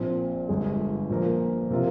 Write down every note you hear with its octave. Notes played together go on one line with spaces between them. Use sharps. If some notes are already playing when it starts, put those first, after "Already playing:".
Already playing: A#1 A#2 F3 C4
G1 G2 D3 G#3
A#2 F3 A#3
C3 F3 A#3 F4